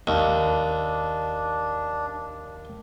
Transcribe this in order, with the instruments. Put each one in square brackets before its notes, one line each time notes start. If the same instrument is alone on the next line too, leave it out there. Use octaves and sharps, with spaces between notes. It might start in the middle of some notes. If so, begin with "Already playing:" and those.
[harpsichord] D#2 [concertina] D4